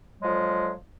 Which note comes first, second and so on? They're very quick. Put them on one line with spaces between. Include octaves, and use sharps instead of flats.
F#3 G#3 F3 D3